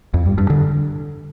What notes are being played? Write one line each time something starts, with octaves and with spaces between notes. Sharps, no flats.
F2
G2
G2
D3